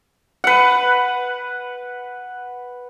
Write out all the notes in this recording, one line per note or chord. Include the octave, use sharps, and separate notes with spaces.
B4 F#5